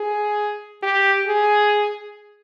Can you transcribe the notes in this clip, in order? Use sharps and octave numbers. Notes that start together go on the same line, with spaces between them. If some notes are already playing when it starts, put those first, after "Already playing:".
Already playing: G#4
G4
G#4